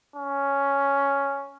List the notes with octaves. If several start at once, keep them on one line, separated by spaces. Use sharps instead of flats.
C#4